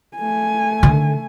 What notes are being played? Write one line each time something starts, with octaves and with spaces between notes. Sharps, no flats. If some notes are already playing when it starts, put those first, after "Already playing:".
A3 G#5
D3 D#3